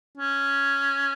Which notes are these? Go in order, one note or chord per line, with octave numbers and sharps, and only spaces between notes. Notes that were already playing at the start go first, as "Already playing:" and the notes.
C#4